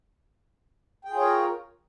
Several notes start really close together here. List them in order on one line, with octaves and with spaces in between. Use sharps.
G5 G#4 F4 C#5 A#4